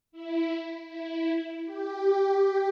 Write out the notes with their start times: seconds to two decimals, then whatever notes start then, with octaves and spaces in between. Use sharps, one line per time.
0.12 E4
0.88 E4
1.66 G4